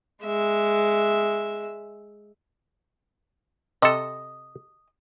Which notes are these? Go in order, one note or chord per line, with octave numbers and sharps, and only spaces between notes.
G#3 E5
C3 A4 D#5